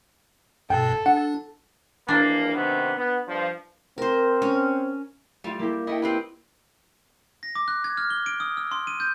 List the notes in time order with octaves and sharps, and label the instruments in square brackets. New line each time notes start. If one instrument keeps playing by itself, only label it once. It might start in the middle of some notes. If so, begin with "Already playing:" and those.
[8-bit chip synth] G2 B2 [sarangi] A4 [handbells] G5
[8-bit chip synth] D4 [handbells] F#5
[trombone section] G#1 E3 A#3 [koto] D4
[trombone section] C3 D#3 B3
B3
G2 F3
[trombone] C4 [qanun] A#4 C5
[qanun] C#4
[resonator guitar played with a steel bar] G3 [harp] A3 F4 F5
[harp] A#3 E4 G4
[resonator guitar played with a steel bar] A3 E4 [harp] D#5 G5
[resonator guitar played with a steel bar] C4 G4 B4
[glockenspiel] A#6
D6
F#6
G#6
F6
G7
D7
D#6
E6
C6
D#7
G6